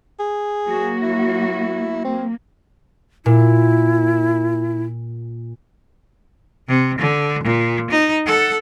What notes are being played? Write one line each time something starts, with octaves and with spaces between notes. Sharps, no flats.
G#4
F#3 A#3 F#4
E4
A#3 C4
A#2 E4
C3
D3
A#2
D#4
A4 F#5